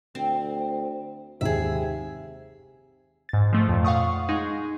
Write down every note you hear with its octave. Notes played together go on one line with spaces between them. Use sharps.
D2 C4
G#1 D#2 C3 G#4 E5
G#2 A6
F3 A3
F2 A#2
F5 F#5 C#6 D#6
G#3 D#4 G#4